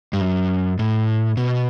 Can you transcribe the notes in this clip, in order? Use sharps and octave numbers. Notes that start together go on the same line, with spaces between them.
G2
F#2
A2
B2